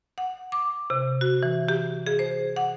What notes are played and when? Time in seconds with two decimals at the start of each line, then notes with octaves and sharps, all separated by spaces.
0.18 F#5
0.52 D6
0.90 C3
1.21 F#4
1.43 E3
1.69 G4
2.06 G#4
2.19 C5
2.56 F#5